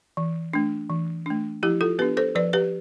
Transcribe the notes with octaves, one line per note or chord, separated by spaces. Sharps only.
E3
A3 D4
E3
A3 D4
F3 E4 G4
F4 A4
B3 D4 G4 B4
A4 C5
F3 B4 D5
G4 B4